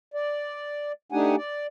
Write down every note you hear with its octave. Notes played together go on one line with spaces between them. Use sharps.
D5
A3 D4 D#4 G4 F#5 G#5
D5